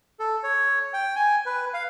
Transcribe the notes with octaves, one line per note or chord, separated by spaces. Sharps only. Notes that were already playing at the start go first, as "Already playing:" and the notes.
A4
C#5
G5
G#5
B4
F5